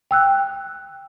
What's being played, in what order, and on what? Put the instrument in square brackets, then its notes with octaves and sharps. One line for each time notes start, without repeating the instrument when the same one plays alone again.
[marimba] G5 E6 F#6